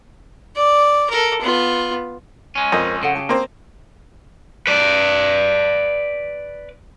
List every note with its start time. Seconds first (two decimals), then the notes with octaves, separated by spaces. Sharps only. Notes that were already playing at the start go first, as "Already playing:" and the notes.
0.56 D5
1.09 A4 A#4
1.41 B3 F4
2.55 G#3 C#4
2.72 F2 A#4 C5 D#5
3.03 C#3 A4 F#5
3.15 G4 G#4 A5
3.29 A#3 C4
4.67 B4 D5